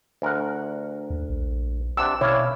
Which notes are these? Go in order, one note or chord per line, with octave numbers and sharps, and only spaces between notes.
D2 A#4 F#5
D#2
A#1
C3 D4 F#5 E6
B2 E4 C#5 D5 F5